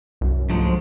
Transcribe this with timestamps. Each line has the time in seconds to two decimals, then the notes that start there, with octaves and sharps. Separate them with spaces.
0.21 C2 F#2
0.50 C#2 G#2 D3 F3 F#3 G#3 A3